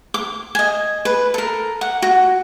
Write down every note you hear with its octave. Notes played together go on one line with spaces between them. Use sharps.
D6
D#5 G#5
B4
A4 A#4
F#5
F#4